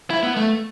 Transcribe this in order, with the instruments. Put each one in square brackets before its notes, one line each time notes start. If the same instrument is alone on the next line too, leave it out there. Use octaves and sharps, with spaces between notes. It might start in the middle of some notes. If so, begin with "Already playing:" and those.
[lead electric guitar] E4
B3
A3